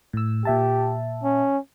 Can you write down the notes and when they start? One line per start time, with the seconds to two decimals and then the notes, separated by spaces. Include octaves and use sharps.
0.13 A2 E6
0.45 A#2 G4 E5 A5
1.23 C#4